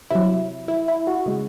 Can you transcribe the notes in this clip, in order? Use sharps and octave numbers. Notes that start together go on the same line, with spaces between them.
C3 F#3 E4
E4
E4
F#4
C#3 G#3